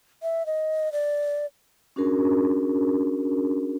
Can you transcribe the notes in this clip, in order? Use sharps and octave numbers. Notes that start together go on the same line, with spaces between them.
E5
D#5
D5
C#4 D4 F#4 G#4 A#4